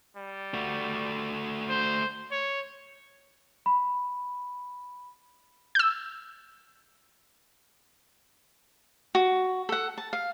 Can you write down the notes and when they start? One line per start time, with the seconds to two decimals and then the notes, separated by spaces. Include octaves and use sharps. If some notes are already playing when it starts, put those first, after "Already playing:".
0.17 G3
0.54 A3 F#4
1.69 C5
2.31 C#5
3.66 B5
5.75 E6 G6
9.15 F#4
9.69 A4 F#5
9.98 A5
10.13 F5